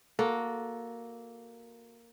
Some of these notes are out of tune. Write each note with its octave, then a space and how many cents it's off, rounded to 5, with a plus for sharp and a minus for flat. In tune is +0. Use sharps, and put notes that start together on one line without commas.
A#3 +0 F#4 -10 A4 -5